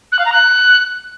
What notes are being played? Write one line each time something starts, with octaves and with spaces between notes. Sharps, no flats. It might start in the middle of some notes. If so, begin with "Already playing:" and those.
F#6
F5
A#5
F#6